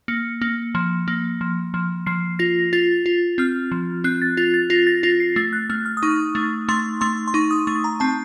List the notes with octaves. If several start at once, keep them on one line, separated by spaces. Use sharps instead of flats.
A#3 C#7
A#3
F3
A#3
F3
F3
F3 C7
F4 A#6
F4 A6
F4
C4 F6
F3
C4 F#6
A6
F4 A6
A6
F4 A#6
A6
F4 A#6
C7
A3 A6
F#6
A3 F6
F6
D#6
D#4 C#6
A3
A3 C6
A3 C6
C6
D#4 C#6
D#6
A3 C#6
A#5
C4 A5